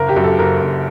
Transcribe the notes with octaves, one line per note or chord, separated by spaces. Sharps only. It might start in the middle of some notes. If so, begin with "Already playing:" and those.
Already playing: F#1 A#4
G4
F#2
A4
F#1 A#4
F#1